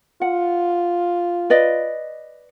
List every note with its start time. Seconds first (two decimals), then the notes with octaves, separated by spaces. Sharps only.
0.22 F4 F#5
1.50 B4 D5 D#5